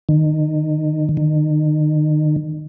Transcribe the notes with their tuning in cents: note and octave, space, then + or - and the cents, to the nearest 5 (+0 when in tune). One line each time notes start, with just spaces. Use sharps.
D#3 -20
D#3 -30